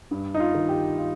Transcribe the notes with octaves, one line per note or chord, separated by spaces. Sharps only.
G2
D#4
F4
D#3
G4
F4